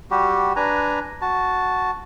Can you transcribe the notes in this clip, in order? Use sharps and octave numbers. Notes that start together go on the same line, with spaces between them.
G3 F#4 G4
D4 B4 G#5 A#5
F#4 A5